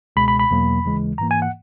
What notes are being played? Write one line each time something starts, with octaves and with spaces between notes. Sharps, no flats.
C#2 B2 G#3 B5
B5
B5
E2 B2 F#3 A#3
D#2 C#3 E3 G#3
G#2 E3 A#3 A#5
G#5
F#5